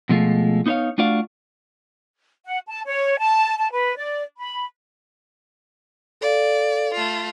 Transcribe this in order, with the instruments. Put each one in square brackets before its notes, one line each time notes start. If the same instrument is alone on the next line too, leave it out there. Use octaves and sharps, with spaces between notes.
[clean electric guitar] B2 F3 G#3 A3 F4
B3 D#4 E4 C5 C#5 F5
A3 D4 F4 F#4 D5 F5
[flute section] F#5
A5
C#5
A5
A5
B4
D5
B5
[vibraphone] A4 F5 [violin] D5
[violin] A3 F4